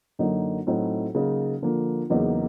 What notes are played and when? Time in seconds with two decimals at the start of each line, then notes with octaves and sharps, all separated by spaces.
0.19 F#2 D3 F#3 A#3 D#4
0.67 A2 F#3 A3 C4 D#4
1.15 C#3 F#3 A#3 D#4
1.62 D3 F3 A#3
2.10 E2 C#3 F#3 A#3 D#4